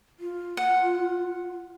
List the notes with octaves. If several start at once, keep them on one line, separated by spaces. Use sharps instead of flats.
F4
F#5